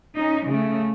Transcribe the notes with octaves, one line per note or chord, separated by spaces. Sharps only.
C#4 D#4
C#3 A3